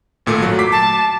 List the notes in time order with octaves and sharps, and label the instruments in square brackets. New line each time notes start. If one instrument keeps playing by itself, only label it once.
[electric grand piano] G#1 A#2 A3
F#3
D6 B6 C7
[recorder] A5